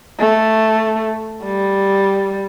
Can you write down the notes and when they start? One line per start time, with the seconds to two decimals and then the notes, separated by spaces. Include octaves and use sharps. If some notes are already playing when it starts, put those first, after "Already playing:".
0.20 A3
1.45 G3